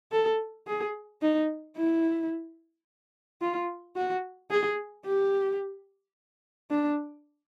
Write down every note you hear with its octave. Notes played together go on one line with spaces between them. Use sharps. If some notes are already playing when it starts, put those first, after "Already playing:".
A4
G#4
D#4
E4
F4
F#4
G#4
G4
D4